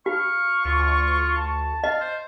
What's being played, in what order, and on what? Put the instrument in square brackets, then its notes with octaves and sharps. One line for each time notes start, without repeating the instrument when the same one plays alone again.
[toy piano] F#4 [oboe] F5 [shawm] C#6
[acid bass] D2 [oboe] F4
[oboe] A5
[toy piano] D#5 [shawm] F5
[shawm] C5